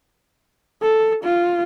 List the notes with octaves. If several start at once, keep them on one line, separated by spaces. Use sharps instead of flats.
A4
F4